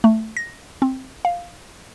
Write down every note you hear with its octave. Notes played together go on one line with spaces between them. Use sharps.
A3
A#6
C4
F5